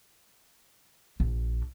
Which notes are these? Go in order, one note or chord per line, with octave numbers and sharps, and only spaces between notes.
A#1